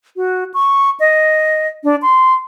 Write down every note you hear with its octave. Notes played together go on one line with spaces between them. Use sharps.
F#4
C#6
D#5
D4
C6